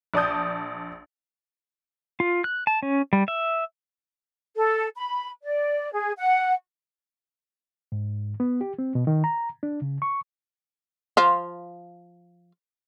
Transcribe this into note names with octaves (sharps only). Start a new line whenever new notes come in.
A#1 D5 A5 D#6 G6
F4
F#6
A5
C#4
G3
E5
A4
B5
D5
G#4
F#5
G#2
B3
G4
C4
B2
D#3
A#5
D4
C#3
C#6
F3 F4